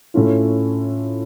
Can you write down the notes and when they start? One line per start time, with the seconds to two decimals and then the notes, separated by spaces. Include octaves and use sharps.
0.14 A2 A3 C#4 F4